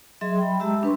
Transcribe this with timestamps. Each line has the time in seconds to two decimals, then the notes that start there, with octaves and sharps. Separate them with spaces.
0.21 F#3 G#4 D#5 E5 C6
0.38 G5 B5
0.60 G#3 G4 E5 A5 A#5 E6
0.83 D4 B4 C6 C#6